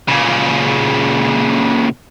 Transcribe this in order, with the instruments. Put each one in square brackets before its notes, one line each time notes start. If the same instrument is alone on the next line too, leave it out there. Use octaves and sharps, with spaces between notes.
[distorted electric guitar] A#2 C#3